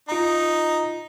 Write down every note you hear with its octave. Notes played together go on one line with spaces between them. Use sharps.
D#4 F4 A#5